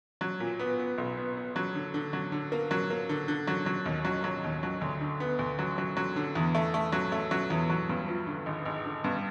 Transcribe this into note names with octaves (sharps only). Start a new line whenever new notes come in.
F#3
A#2
B3
B3
B1
B3
B3
F#3
D3
D3
F#3
D3
A#3
F#3
A#3
D3
D3
F#3
F#3
D#2
F#3
F#3
D#2
F#3
D2
D3
B3
D2
F#3
F#3
F#3
D3
E2
A3
A3
F#3
A3
F#3
E2
F#3
G2
F3
D3
G#1
G#1
D3
G2